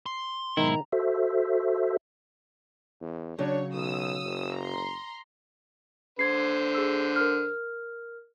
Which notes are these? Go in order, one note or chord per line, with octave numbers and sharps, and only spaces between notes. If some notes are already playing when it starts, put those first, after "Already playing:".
C6
B1 G#2 D#3 E4 A#5
F#4 A4 C5 E5
E2
C#3 F#3 D4 C#5
B1 D#6 E6
F#1
A#5 C6
D3 C5 G#6 C7
G#4 E6
A#4 F6